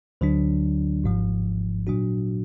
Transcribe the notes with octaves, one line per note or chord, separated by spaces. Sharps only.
D2 D3 F#3 D4
G#1 G#2 F3
A#2 F#3 D4 F#4